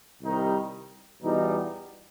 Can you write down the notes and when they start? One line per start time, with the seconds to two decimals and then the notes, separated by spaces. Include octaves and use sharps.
0.21 C2 C3 D#3 G3 D#4
1.22 E2 B2 G3 D#4